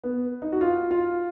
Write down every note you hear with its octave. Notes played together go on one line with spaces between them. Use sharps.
B3
D#4
F#4
F4
F4